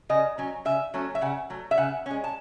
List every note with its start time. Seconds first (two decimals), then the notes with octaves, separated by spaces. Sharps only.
0.09 C#3 D#5
0.38 F#3 C#4
0.65 C#3 E5
0.94 F#3 A3 C#4
1.15 E5
1.21 C#3 F#5
1.50 F#3 A3
1.71 E5
1.78 C#3 F#5
2.06 G#3 C#4
2.24 A5